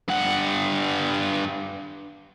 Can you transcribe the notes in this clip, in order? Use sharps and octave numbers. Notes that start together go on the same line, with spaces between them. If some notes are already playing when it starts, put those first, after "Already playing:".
G2 F#5